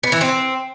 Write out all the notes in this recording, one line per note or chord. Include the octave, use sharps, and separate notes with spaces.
B3
E3
C4